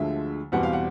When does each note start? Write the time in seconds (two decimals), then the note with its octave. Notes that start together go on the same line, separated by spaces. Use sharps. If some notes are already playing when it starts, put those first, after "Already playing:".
Already playing: D2 D3 F3 G#3 E5
0.52 E2 B2 G3 C4 F#5
0.63 F5
0.73 F#5